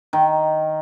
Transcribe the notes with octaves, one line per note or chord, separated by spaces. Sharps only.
D#3